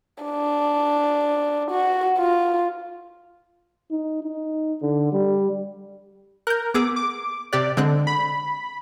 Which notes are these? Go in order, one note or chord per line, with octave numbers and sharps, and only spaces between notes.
D4
F#4
F4
D#4
D#4
D3
G3
A#4 F#6 G6
B3 G#4 D6 E6
D6
C3 G4 D5 F#6
D3 G#3 C4 F#6
B5